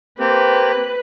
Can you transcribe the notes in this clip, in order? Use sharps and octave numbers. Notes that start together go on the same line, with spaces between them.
A#3 C4 G4 B4